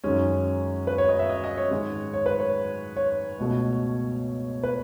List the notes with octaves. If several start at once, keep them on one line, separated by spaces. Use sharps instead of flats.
F#2 D#3 G#3 C#4
B4
C#5
D#5
E5
D#5
D#5
C#5
G#2 D#3 G#3
C#5
B4
C#5
C#5
C#2 B2 A3
B4